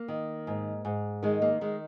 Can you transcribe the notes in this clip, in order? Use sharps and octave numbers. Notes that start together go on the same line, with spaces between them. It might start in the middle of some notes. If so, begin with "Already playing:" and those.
Already playing: A#3
D#3
G#2
G#2
D#3 G#3
A#3
D#3 G#3